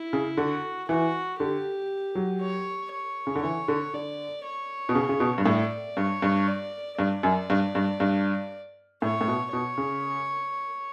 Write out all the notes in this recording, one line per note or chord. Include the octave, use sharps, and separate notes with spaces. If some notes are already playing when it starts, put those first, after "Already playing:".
Already playing: E4
C#3
D3 F#4
E3 F#4
D3 G4
F#3
C#5
C#5
C#3
D3
E3 C#5
D3
D3 D5
C#5
B2
C#3
C#3
B2
G2
A2 D5
G2 C#5
G2
D5
G2 D5
F#2
G2
G2
G2
A2 C#5
A2
B2
B2 C#5
C#3